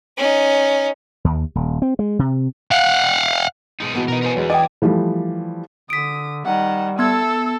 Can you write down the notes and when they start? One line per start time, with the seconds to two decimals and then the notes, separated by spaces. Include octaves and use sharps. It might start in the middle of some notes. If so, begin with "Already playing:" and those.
0.17 C#4 D#4
1.24 D#2
1.55 D#1
1.82 C4
1.99 G#3
2.19 C3
2.71 F5 F#5
3.80 B2 G#3 D#4
3.94 E3 B3 F#4
4.08 B2 D#4 A#4 D#5
4.22 A#4 C5 G#5
4.36 E2 F#3 G#3
4.50 D#5 G5 D6 D#6 G#6
4.82 E3 F3 G3 A3
5.90 D3 D#6 B6 D7
6.45 D#3 G3 F#5
6.99 B3 A4 E6 G#6